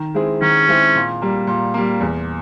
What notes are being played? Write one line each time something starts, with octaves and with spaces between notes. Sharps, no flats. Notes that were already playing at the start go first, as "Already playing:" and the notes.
Already playing: D#3
G#3 C4 E4 G#4
D#3 C#4
G#3 C4 E4 G#4
A#2
G3 A#3
A#2
G3 A#3
E2